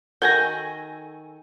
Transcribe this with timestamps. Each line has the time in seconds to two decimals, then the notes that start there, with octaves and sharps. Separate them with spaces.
0.22 D#3 F#4 A4 G#5 G6 G#6 A#6